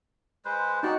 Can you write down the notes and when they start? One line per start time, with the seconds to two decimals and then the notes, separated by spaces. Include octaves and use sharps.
0.45 G#3 B4 C5
0.83 D#4 F#4 D5 G5 A5